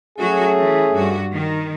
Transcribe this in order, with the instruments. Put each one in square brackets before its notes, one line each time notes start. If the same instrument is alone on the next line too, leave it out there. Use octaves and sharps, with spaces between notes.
[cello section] F#3 F#4 [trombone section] A3 C#4 G#4
[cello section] E3
G2 F#4
D#3